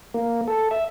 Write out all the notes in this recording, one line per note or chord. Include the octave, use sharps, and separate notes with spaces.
A#3
A4
E5